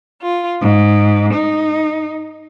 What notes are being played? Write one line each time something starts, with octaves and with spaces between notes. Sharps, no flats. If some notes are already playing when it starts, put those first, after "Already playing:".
F4
G#2
D#4